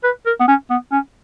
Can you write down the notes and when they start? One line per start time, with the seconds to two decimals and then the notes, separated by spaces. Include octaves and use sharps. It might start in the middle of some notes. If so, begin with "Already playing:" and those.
0.04 B4
0.26 A#4
0.40 B3
0.48 C#4
0.70 B3
0.92 C#4